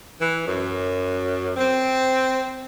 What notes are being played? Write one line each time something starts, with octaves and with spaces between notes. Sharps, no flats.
E3
F#2
C4